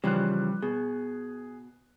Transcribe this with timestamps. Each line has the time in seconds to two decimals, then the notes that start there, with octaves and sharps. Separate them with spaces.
0.04 C#3 E3 F3 G3 F#6
0.62 B2 G#4